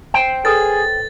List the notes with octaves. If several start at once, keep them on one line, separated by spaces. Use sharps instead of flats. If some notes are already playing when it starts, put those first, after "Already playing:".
C5 G5
G#4 A4 B4 C#5 A6